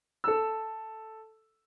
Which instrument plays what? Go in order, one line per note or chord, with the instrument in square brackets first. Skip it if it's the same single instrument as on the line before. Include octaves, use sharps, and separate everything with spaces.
[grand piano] A4 E6